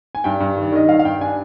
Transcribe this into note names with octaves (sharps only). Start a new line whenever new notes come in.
G#5
G2 G5
G2
D#3
D5
D#3 D#5
G2 F5
F5
G2 G5
D4 G#5